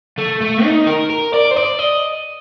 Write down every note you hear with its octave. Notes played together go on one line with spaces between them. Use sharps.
A3
A3
D#4
A#4
A#4
D5
C5
D5
D#5